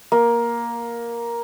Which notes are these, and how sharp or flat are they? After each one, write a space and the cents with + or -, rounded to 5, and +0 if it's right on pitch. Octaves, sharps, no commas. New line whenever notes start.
A#3 +10